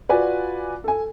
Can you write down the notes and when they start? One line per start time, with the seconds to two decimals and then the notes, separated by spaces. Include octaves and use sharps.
0.09 F4 F#4 B4 D5 G#5
0.84 A4 G#5